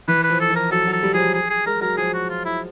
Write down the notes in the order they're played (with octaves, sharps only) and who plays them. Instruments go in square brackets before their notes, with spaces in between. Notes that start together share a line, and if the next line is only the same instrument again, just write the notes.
[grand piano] E3 [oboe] B4
[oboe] B4
[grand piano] F3
[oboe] A4
[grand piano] F3
[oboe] A#4
[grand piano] F#3 [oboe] A4
[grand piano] F#3
[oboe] A4
[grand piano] G3
[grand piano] F3 [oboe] G#4
[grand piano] F#3
[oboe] G#4
G#4
[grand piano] G#3 [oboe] A#4
[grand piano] F#3 [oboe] A#4
[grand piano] F3 [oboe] G#4
[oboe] F#4
F4
E4